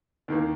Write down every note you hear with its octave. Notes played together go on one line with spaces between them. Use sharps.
D#2 D#3 A#3